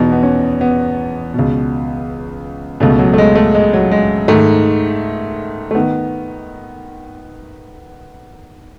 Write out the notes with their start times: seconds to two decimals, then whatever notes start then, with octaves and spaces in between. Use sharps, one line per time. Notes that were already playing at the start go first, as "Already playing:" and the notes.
Already playing: E2 B2 D#4
0.12 B3
0.23 C#4
0.61 B3
1.34 C#2 B2
2.80 C#2 B2 A3
2.99 F#3
3.14 A3
3.18 G#3
3.35 A3
3.54 G#3
3.73 F#3
3.92 G#3
4.28 G#2 D#3 A3
5.71 A3
5.75 D#3 B3